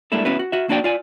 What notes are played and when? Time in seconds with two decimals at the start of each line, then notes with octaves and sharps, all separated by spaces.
0.12 G3 G#3 A#3 D4 E4 A4
0.25 B3 C#4 E4 F#4 B4
0.39 F#4
0.52 F#4 E5
0.69 A#3 D4 F#4 D5 G5
0.84 F4 D5 G#5